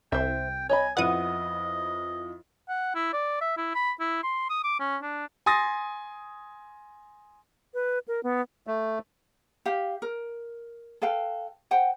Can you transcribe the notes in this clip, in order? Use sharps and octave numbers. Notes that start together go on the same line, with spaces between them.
C2 C5 E5 G5
C#5 D#5 G#5 B5
F2 B3 E4 D#5 F#5 D#6
F#5
E4
D5
E5
E4
B5
E4
C6
D#6
D6
C#4
D4
G#5 C6 D#6 A6 A#6
B4
A#4
B3
A3
G4 F5
A#4
A4 B4 F5 G5
C5 F#5 G5